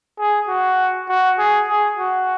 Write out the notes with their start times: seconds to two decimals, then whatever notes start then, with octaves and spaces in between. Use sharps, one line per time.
0.19 G#4
0.48 F#4
1.09 F#4
1.39 G#4
1.68 G#4
1.98 F#4